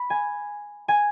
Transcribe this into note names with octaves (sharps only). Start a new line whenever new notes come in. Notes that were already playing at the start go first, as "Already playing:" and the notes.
Already playing: B5
G#5
G#5